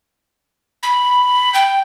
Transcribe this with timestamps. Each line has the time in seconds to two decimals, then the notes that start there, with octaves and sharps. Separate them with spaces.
0.83 B5
1.54 G5